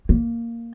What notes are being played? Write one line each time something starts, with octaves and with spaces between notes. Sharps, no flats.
A#3